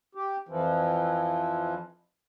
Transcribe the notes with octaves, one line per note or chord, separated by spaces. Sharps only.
G4
F2 E3 F3